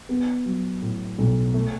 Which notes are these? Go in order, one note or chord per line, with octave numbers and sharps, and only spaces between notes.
B3
F#3
A2
B1
A3